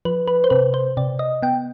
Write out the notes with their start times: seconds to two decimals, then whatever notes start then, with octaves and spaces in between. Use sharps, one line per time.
0.05 F3 B4
0.28 B4
0.44 C5
0.50 C3 B4
0.74 C5
0.97 C3 D5
1.19 D#5
1.42 B3 G5